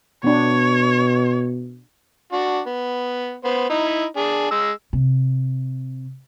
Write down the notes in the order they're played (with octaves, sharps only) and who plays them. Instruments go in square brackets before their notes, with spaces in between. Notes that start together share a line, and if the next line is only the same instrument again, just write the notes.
[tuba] B2 [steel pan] B3 D4 [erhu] C#5
[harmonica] D4 F#4
B3
B3 C5
D#4 E4
D4 G#4
G#3 E6
[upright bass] C3